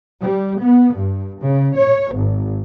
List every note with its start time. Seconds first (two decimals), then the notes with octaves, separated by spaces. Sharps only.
0.21 G3
0.60 B3
0.95 G2
1.41 C#3
1.76 C#5
2.14 G#1